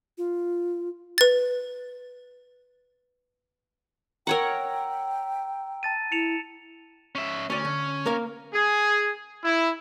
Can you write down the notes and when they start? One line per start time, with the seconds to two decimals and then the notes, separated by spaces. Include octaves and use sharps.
0.18 F4
1.18 B4 A6
4.27 A#4 C#5 F#5 G5 A#5 E6
5.83 A5 A6 D#7
6.12 E4 C#7 E7 F7
7.15 C#4 E5
7.50 D2 C#4 D5
7.65 D3
8.06 A#3 A#4 F5
8.53 G#4
9.44 E4